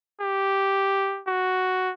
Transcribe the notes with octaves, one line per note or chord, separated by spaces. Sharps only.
G4
F#4